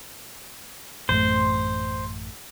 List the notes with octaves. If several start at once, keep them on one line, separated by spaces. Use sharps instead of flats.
A1 F#2 A3 C5